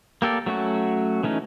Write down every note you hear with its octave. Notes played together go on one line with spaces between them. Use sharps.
A#3 G4 A4 D5
F#3 A3 C#4 F#4
E3 A3 C#4 D#4